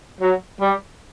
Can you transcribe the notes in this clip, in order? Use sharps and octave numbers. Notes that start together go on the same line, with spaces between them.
F#3
G3